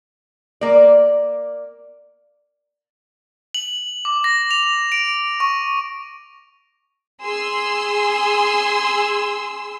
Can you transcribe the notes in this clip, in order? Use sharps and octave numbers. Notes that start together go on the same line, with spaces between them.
A#3 D5
F#7
D6
A#6
F7
D7
C#6
G#4 C6 E6